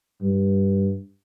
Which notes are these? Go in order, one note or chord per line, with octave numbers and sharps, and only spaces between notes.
G2